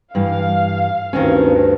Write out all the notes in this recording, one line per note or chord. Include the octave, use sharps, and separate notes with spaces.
G2 E3 F5
D2 G2 D#3 C4 C#4